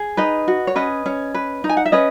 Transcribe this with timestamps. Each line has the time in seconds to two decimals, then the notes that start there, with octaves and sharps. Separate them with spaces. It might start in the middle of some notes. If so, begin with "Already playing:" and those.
Already playing: G#4
0.17 D#4 B4 D#5
0.48 F#4
0.67 C#5
0.76 C#4 B4 D#5
1.06 C#4
1.34 B4
1.64 D#4
1.69 G#5
1.77 F#5
1.85 E5
1.92 C#4 B4 D#5